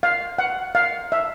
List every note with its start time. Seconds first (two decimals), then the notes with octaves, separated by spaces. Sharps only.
0.03 F5
0.38 F#5
0.75 F5
1.12 E5